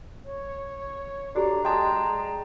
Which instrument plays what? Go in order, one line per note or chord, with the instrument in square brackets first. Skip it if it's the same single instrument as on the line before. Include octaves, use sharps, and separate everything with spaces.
[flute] C#5
[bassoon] D4 [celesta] F#4 G4 A4 [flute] A#5
[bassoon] G#3 [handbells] G5 A5 [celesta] C6 D#6